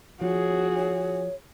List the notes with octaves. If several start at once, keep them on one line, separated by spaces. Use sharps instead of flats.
F3 F#4 G#4 C#5
C#5